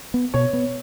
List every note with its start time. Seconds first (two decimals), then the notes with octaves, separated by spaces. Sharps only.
0.14 B3
0.34 B2 C#5
0.53 B3